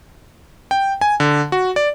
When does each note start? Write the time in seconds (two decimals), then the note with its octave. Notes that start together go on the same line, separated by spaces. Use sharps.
0.71 G5
1.01 G#5
1.20 D3
1.52 F#4
1.76 D5